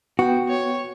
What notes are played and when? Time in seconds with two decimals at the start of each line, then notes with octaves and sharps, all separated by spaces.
0.19 B3 F#4 G5
0.48 C#5